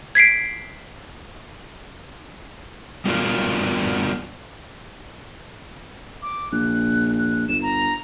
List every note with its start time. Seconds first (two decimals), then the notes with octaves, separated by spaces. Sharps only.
0.15 G#6 B6 C7 D7
3.06 G3 B3 D4 F4 F#4 A#4
6.22 D6
6.52 A#1 F#6
7.18 F#6
7.48 G1 E7
7.62 A#5